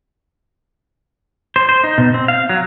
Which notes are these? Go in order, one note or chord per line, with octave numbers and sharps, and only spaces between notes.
C5
C5
D#4
B2
C4
F5
F#3